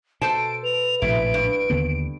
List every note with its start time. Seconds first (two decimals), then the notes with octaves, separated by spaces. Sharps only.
0.21 B2 A4 C5 A5 D7
0.64 B4 F7
1.02 A#1 A2 C3 E4 D7
1.34 G2
1.70 D#2 D3 B3